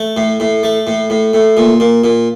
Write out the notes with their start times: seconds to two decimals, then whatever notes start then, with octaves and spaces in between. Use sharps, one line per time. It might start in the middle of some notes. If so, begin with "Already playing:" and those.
Already playing: A3
0.17 A2
0.40 A2
0.63 A3
0.87 A2
1.10 A2
1.33 A2
1.57 A#2
1.80 A#2
2.04 A#2